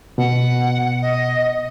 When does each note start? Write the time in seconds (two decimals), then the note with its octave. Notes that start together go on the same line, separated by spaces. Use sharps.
0.18 B2 F#5
1.02 D#5